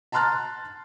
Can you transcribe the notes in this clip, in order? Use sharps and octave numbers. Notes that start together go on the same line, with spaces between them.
A5 A#5 C6 F6 F#6 A6